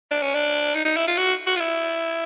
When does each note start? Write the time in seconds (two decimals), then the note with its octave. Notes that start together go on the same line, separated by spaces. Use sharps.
0.11 D4
0.22 C#4
0.34 D4
0.75 D#4
0.85 D#4
0.97 E4
1.07 F4
1.18 F#4
1.46 F#4
1.56 F4
1.60 E4